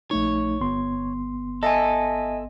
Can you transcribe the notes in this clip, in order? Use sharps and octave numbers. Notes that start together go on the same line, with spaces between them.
A#1 A3 D#4 C#5
G1 B3 C6
A4 D#5 E5 G#5